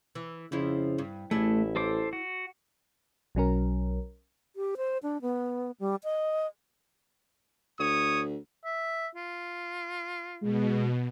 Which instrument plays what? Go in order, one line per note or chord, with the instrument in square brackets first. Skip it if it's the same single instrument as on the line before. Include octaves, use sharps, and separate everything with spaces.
[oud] E3
[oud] F2 F3 E4 [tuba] C#3
[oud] G2
[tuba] A1 [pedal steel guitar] A3 [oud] E4 G#4 D5
[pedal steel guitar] A4 C5 D6
F#4
[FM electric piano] B1 F#3 C#4 A#4
[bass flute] G4
C5
D4
B3
G3
D#5
[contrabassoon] D2 [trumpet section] C#5 D#6
[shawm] E5
F4
[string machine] B2 [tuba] G#3